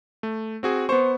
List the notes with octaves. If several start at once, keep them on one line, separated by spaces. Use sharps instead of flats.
A3
C4 F#4 G#4
B3 C5 C#6